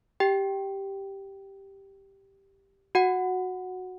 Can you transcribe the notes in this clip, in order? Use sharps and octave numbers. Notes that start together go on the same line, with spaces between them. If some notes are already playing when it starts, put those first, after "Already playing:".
G4 G5
F#4 F#5